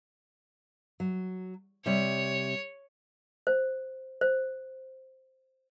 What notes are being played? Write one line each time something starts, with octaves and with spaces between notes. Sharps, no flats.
F#3
C3 G3 C#5
C5
C5